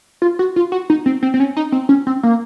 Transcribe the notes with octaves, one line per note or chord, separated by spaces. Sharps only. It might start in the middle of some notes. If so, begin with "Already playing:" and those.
F4
F#4
F4
F#4
D#4
C4
C4
C4
C#4
D#4
C4
C#4
C4
A#3